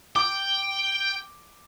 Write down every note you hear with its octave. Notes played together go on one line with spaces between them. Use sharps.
G5 D6